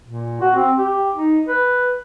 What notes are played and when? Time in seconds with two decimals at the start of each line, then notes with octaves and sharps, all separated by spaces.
0.07 A#2
0.41 F#4
0.55 C4
0.78 G4
1.15 D#4
1.48 B4